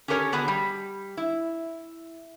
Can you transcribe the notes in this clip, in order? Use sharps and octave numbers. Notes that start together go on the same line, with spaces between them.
C#4 G4 A4 A#4 C5 C#5
D3 B3 D4 F#4 G#4
G3
E4